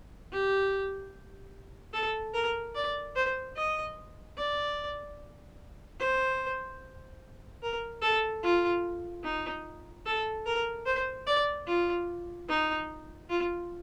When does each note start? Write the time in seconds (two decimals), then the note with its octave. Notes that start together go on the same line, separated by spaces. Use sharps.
0.32 G4
1.93 A4
2.34 A#4
2.75 D5
3.16 C5
3.57 D#5
4.37 D5
6.00 C5
7.63 A#4
8.02 A4
8.43 F4
9.24 D#4
10.06 A4
10.46 A#4
10.86 C5
11.27 D5
11.67 F4
12.49 D#4
13.30 F4